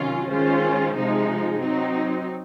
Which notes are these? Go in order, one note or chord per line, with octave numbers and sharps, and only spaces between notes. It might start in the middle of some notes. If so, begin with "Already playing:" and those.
Already playing: C3 D#3 F#3 C#4 F4
D#3 G#3 C#4 F4 C5
C3 F3 G#3 D#4
F#3 C4 D#4